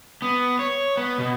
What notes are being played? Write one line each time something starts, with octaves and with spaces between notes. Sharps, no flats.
B3
C#5
B3
B2